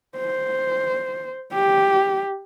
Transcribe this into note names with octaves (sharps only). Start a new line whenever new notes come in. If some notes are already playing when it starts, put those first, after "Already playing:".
C5
G4